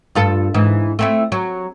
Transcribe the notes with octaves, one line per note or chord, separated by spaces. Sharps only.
G2 F4 A4
G#2 E3
A3 C4 E4
F#3